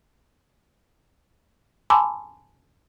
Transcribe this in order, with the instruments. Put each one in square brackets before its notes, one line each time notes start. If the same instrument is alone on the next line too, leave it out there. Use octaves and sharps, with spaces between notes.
[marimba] G#5 A5 B5 C6 D6 E6